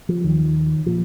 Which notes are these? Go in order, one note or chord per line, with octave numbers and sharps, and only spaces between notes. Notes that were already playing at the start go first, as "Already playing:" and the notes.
F3
D#2 D#3
A#2 F3